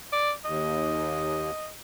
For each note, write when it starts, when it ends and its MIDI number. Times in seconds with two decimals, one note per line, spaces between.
0.13 0.32 74
0.45 1.51 39
0.45 1.68 75